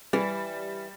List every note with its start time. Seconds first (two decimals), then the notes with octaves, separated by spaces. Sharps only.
0.13 E3 G3